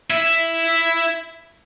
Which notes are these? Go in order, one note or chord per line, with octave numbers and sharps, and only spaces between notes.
E4 E5